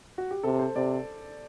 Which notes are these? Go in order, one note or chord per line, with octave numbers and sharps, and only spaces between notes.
F#4
G4
C3 A4
C5
C3 D5